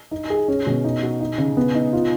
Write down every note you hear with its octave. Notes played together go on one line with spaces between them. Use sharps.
D#4
G#4
C#4
B2
D#4
F#4
D#4
C#3
B3
D#4
F4